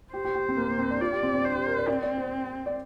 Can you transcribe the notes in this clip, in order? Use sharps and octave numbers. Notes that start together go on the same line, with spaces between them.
G4 C5
G4
G4
C4
A#3
A#3
C4
D4
F4 D5
G4
C4
C4
D4 C5
G4
A#4
D5
C4 D5
D5
C5
D5